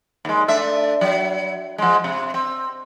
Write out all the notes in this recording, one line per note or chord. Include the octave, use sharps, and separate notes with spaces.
D#2 G#3
A3 D4 E5
F#3
F3 G#3
C3
C4